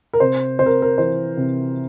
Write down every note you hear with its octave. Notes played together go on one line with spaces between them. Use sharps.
A#4
C3 C5
C3 C5
A#4
A#4
E3 C5
C3